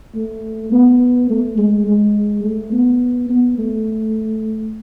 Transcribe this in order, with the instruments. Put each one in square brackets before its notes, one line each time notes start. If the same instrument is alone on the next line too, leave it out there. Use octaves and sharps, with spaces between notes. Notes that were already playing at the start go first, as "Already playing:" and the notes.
[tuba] A3
B3
A3
G#3
G#3
A3
B3
B3
A3